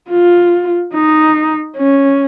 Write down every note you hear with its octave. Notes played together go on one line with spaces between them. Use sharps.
F4
D#4
C#4